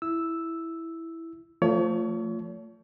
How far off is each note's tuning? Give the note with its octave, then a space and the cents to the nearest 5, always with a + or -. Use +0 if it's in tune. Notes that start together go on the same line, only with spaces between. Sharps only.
E4 +0 E6 +0
F3 +0 A3 +30 C#5 +35